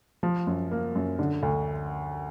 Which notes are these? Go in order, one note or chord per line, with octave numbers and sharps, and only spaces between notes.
F3
F#2
A#3
F#2
D3
D2